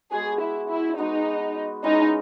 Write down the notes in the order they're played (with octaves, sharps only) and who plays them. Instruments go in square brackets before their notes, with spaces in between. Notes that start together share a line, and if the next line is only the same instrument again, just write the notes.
[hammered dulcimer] G#3 B3 F#4 [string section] G#4
[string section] E4
E4
[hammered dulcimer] G#3 B3 F#4 [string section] D#4
[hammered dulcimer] E3 G#3 C#4 E4 [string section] D#4